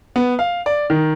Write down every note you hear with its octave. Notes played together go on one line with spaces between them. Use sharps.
B3
F5
D5
D#3